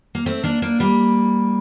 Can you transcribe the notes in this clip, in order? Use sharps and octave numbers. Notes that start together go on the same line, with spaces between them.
A#3
A3 C4
A#3 D4
A#3 D4
G3 A#3